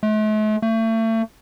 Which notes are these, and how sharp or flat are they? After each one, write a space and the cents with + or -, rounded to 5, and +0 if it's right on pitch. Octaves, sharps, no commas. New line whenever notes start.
A3 -45
A3 +35